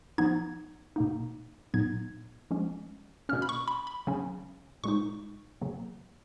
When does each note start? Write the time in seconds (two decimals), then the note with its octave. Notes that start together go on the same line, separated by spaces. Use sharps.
0.18 F3 B3 D#4 G#6
0.96 B2 A#3 D#4
1.74 A#2 F#3 B3 D#4 G#6
2.51 F3 G#3 C#4
3.29 B2 A#3 C#4 F6
3.42 B5
3.49 C#6
3.68 B5
3.87 B5
4.07 C#3 F#3 C#4
4.84 A#2 G#3 D#4 C#6
5.61 C#3 F#3 A#3